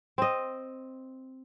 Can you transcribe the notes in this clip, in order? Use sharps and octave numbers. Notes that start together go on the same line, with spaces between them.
C4 D#5